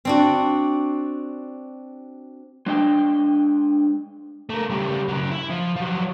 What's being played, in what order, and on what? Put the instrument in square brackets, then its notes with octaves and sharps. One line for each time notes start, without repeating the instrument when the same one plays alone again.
[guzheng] C4 D4 F#4
[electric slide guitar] G#3 D4 D#5 G5
[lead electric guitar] A3 A#4
C#3 G3
C#3 F#3
E4
F3
F3 F#3